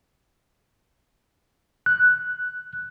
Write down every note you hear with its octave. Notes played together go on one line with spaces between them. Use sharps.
F#6